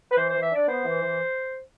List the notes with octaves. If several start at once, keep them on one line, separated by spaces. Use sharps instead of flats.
B4
E3 C5
E3 C5
E5
D4 D5
B3 C5
E3
E3